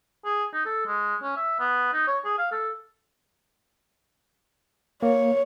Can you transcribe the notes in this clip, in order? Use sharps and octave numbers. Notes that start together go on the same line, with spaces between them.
G#4
D#4
A4
G#3
C#4
E5
B3
D#4
C#5
G#4
F5
A4
A#3 C#5